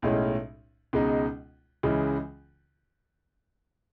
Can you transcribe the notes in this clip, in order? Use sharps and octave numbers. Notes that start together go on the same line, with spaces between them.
B1 A2 G#3 C#4
C#2 B2 G#3 D#4
C#2 C#3 E3 G#3